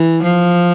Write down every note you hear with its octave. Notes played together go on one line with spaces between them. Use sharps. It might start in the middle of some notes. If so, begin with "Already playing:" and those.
Already playing: E3
F3